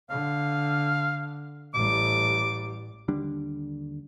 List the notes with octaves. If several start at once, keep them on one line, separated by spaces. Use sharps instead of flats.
D3 F5
A1 G3 D6
D#2 D3 G3 D4